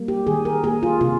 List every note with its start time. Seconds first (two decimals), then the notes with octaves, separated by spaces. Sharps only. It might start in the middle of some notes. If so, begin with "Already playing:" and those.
Already playing: G3 A#3
0.08 G4
0.27 D#3 G#4
0.45 A#4
0.64 A#3 G#4
0.83 F4
1.01 C3 F4